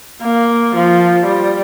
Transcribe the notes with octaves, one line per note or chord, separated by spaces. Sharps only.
A#3
F3
G3